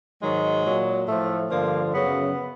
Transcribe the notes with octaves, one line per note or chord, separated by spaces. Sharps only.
G#2 D#3 F#3 G#3
A#2 F#3
A2 F3 A3
G2 D3 F3 A#3
F#2 C#3 F#3 B3